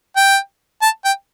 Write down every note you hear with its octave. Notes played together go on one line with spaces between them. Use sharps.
G5
A5
G5